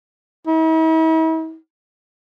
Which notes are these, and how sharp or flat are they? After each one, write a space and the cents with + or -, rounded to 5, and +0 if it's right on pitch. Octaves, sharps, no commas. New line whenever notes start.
E4 -45